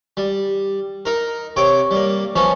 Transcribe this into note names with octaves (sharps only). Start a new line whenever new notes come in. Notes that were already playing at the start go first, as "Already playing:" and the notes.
G3
D#4 A#4
C3 C#5 G5 D6
G3 A#3
F3 B3 C#4 D#4